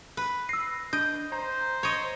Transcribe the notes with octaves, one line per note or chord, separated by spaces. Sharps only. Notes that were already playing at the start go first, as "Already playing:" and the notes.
B4
E6 A#6 C7
D4 D#5 G6
C5 A#5
C#5 D#5